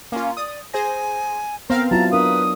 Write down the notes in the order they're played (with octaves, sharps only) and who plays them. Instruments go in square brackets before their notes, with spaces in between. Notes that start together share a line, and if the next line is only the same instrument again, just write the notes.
[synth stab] A#3 F4 [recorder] C#4
[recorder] D5 [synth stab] D#6
[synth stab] G#4 C5 A#6 [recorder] G#5
[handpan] B3 [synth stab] C4 F5 F6 [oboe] A#4
[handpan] F#3 E4 F4 [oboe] A5 [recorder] A#5
[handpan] D4 A#4 [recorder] B4 [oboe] D#6